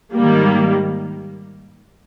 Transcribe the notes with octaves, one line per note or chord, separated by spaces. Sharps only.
G#2 D#3 G3 A#3